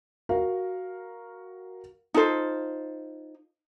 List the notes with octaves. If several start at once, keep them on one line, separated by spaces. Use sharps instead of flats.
F#4 A#4 F5
D#4 F4 A4 C5